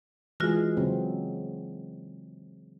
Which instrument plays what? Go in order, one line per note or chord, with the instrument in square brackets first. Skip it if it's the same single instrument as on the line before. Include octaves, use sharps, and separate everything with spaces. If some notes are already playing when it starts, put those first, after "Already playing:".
[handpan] E3 G#3 G#4 [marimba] F4 F#4 A#6
[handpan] C#3 F#3 C4